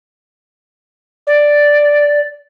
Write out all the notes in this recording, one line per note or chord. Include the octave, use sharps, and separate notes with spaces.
D5